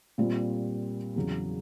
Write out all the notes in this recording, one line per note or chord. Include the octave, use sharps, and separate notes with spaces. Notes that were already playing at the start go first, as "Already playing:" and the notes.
A#2 G3 C4 F4
E2 C#3 F#3